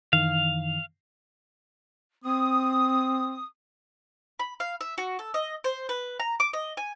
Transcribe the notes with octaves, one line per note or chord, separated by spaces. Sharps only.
F#2 D#3 E3 F5
C4 D#6
B5
F5
E5
F#4
A4
D#5
C5
B4
A#5
D6
D#5
G#5